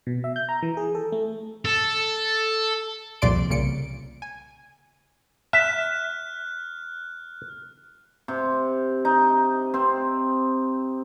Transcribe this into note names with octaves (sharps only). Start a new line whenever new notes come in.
B2
E5
G6
A#5
E3
G#4
A4
A3
A4
C2 F2 A#2 D5 C6 D7
C2 A#2 C#3 C#7 D7
G#5
E5 F6 F#6
C3
D#4
C4